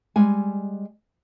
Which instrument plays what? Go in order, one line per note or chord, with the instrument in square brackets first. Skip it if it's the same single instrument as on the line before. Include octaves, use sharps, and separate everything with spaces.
[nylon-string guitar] G3 G#3 G#5